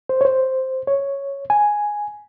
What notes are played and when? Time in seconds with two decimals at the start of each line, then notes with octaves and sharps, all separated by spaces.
0.09 C5
0.21 C#5
0.25 C5
0.87 C#5
1.50 G#5